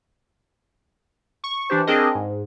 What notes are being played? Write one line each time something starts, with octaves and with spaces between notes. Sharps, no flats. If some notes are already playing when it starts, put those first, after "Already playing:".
C#6
E3 D4 G4 C5
C4 D4 G#4 A#4 D#5
G#2